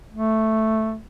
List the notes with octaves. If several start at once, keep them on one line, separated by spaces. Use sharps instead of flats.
A3